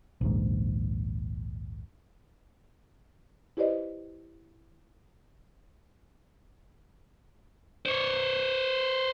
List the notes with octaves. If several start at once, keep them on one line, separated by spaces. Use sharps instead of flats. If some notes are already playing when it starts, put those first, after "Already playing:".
A#1 D#2 G#2
E4 G4 B4 C5 D5 D#5
C5 C#5